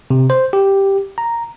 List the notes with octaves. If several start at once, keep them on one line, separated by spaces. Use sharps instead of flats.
C3
C5
G4
A#5